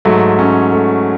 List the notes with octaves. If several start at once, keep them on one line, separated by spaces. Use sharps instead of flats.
G#2 F#3 A3
C#4
A3